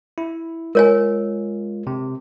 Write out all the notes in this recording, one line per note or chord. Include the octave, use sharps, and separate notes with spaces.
E4
G#3 F4 A#4 C#5 G#5
C3